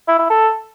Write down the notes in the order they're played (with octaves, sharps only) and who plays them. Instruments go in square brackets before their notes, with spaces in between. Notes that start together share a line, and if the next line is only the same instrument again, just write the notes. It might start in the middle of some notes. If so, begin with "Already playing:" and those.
[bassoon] E4
E4
A4